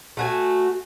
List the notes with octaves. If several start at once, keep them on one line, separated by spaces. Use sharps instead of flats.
A3 F#4 G#5